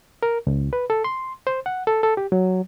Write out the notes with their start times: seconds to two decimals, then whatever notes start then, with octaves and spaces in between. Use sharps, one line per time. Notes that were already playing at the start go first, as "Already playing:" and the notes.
0.23 A#4
0.47 C#2
0.73 B4
0.90 A4
1.04 C6
1.47 C5
1.66 F#5
1.87 A4
2.03 A4
2.17 G4
2.32 F#3